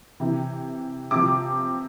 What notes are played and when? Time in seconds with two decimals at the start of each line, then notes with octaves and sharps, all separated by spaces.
0.20 C3 E3
1.11 C3 F3 D6